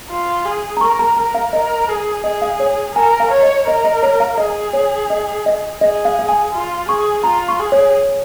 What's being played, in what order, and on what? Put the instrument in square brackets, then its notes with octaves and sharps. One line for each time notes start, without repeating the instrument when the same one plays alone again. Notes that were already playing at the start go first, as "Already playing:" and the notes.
[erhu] F4
G#4
[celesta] A#5
[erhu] A#4 [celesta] C#6
[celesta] A#5
[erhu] A#4 [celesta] A#5
[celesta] F5
[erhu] A#4 [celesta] D#5
[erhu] G#4
[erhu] G#4 [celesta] D#5
[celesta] F5
C#5
[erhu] A#4 [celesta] G#5
[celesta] F5
[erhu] C#5
[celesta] D#5
[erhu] A#4 [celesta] D#5
[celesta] D#5
C#5
F5
[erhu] G#4 [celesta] D#5
[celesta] C#5
D#5
D#5
[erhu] G#4 [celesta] D#5
[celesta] F5
F5
G#5
[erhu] F4
[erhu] G#4 [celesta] C#6
[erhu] F4 [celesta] A#5
[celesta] C#6
[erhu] G#4
[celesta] C#5